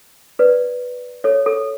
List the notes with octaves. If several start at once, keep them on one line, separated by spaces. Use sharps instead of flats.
B4 D5
A4 C#5
A4